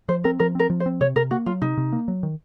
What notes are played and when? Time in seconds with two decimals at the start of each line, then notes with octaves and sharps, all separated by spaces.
0.08 F3 C5
0.24 C4 A#4
0.39 F3 A#4
0.55 C4 A#4
0.70 F3
0.80 C5
0.86 C4
1.01 C3 C#5
1.16 C3 A#4
1.31 A#3 F#4
1.46 F#3 F4
1.62 C3 D#4
1.77 C3
1.92 A#3
2.08 F#3
2.23 D#3